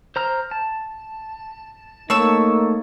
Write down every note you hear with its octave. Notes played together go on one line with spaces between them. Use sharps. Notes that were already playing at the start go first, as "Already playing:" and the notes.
C5 A#5 F6
A5
A3 A#3 D#4 C#5 A5 E6